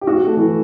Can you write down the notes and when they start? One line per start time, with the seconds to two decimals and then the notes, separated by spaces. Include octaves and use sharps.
0.01 G4
0.07 F#4
0.27 A3
0.37 E3